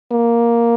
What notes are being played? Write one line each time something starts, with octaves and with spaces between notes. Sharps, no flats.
A#3